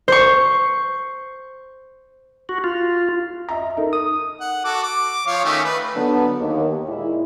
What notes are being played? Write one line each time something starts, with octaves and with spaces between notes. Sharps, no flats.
C5 C#6
F#4
F4
D#5 E5 A#5
D#4 A4 A#4
D#6
F#5
F#4 A4 D6
D6
F3 C#5 F5
D#3 A3 C#4
B4
D3 F#3 B3 D4
D#2
A#2 G#3 E4